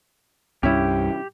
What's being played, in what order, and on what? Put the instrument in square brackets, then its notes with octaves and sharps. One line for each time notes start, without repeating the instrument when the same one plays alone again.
[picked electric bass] C2 G2 G3 [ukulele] C#4 E4 [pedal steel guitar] G4